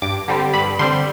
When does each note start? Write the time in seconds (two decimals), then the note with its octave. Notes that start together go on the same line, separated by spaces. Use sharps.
0.02 G2 D6
0.28 D3 G3 C4
0.53 G2 B5
0.79 D3 G3 C4 C6